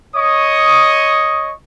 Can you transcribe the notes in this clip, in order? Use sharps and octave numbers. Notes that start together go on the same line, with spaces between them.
C#5 D#5 C#6 D#6